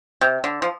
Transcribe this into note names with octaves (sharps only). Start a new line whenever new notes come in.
C3
D3
F3